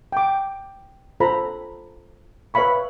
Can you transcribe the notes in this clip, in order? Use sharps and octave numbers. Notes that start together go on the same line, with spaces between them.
G5 D6
F4 A4 C5 A#5 B5
B4 C#5 E5 F5 B5 C#6